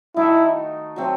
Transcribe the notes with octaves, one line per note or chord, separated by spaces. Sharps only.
D#3 A3 D#4 E4 F#4
F#3 A3 C4